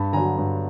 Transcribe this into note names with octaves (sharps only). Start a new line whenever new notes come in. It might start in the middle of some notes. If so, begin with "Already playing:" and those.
Already playing: G2 A5 B5
D3 F#3 G#5 A#5
G2